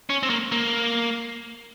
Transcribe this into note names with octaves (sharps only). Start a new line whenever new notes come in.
C#4
C4
A#3
A#3